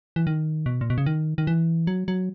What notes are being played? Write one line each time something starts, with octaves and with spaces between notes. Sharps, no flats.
E3
D#3
B2
A#2
B2
C#3
D#3
D#3
E3
F#3
F#3